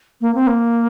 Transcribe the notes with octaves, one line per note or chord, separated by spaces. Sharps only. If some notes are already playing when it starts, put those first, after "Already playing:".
A#3
C4
A#3